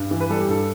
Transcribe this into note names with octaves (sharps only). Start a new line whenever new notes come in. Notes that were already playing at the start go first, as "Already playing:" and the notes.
Already playing: G2
E3
B4
G3 A4
G4
G2 A4